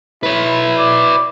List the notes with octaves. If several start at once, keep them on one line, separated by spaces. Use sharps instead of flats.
E4 B4 C#5
D5